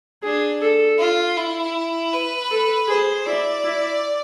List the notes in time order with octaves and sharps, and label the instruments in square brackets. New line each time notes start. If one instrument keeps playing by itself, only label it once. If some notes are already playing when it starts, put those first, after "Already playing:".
[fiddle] D4 [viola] G#4
[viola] A4
[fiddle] F4
E4
B4
[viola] A4
[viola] G#4 [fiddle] C5
[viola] E4 [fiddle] D5
[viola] E4